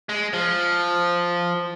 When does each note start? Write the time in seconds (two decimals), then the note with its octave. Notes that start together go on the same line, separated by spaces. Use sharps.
0.09 G#3
0.33 F3